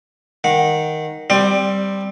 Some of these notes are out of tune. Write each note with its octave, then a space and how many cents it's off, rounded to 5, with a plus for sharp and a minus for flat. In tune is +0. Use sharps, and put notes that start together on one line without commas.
D#3 +0 F#5 -20
G3 +0 C4 +0 D5 +25